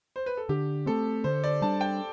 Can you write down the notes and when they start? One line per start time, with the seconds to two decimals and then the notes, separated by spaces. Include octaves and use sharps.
0.16 C5
0.26 B4
0.37 A4
0.49 D3 G4
0.86 A3 C4 A4
1.24 D3 C5
1.44 D5
1.62 G3 D4 A5
1.81 G5